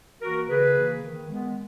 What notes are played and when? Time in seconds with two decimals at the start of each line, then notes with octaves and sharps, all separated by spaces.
0.21 E3 A#3 F#4 A#4
0.48 C#3 G#4 B4
0.75 E3 A#3
1.03 D#3
1.30 G#3 B3